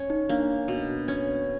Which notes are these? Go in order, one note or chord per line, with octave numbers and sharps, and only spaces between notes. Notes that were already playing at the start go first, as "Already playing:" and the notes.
Already playing: C#4
D#4
A#3 D4
B2
C#4